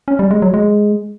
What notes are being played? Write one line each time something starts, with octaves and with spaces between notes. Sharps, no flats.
C#4
G3
G#3
F#3
G#3